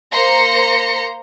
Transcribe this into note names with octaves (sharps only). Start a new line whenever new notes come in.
A#3 C5 A#5 C6 A#6 C#7